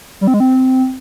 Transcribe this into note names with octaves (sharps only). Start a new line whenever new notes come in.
G3
C4
G#3
C4